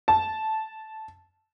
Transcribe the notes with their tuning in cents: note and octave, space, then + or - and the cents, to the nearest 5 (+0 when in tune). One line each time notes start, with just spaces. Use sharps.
A5 -10